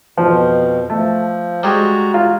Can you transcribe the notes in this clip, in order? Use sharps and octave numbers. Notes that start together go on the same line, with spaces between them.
F2 B2 F3
F3 A3
G3 G#3 F#4 A#5
F4